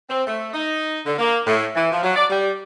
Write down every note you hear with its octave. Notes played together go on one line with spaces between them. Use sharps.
C4
A3
D#4
D3
A#3
A2
E3
F3
F#3
D5
G3